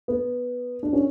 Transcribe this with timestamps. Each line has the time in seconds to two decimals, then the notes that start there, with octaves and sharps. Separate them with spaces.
0.08 B3
0.83 D4
0.93 C#4